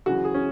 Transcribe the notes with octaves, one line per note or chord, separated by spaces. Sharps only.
F#2 C#3 E3 F#4
G#4
C#4